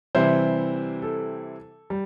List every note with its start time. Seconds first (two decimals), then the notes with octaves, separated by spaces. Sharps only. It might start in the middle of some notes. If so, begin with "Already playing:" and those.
0.15 C3 E3 G3 C4 E4 C5
1.02 A4
1.90 G3